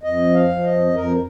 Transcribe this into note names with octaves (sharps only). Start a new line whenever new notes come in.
F2 D#5
F3
F5
F3
D#5
F2
F2 A#4